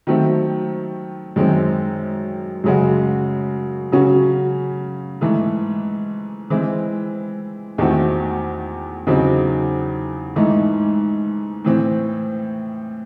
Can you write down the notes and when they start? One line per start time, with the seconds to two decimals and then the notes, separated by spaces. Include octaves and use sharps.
0.07 D#3 F#3 A3 C4
1.36 F#2 D#3 G#3 C4
2.64 F#2 C#3 G#3 C#4 F#4
3.92 C#3 F#3 C#4 F#4
5.21 G#2 E3 A3
6.50 E3 G#3 C4 E4
7.78 E2 D#3 A3 C4 F#4
9.07 E2 C#3 F#3 C4 D#4
10.36 G#2 E3 A3 D#4
11.65 A2 E3 C4